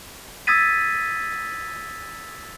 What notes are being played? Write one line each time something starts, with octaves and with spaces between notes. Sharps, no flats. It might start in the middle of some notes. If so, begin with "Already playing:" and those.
D#6 E6 G#6 A6 B6 D#7